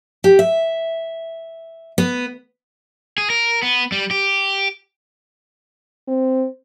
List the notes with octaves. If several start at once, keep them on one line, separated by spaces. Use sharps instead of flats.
G4
E5
B3
G#4
A#4
B3
G3
G4
C4